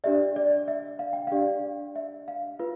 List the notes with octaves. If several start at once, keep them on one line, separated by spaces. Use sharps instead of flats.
D4 G4 D5 E5
D5
E5
F5
G5
D4 G4 D5 F5
E5
F5
F4 B4